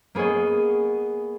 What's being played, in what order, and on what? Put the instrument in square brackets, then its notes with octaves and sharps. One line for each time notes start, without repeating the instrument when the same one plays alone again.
[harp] A#3 B3 G#4 C#5 D#5